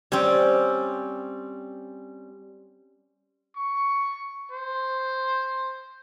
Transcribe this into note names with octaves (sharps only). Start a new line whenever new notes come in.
G3 C4 C#4
C#6
C5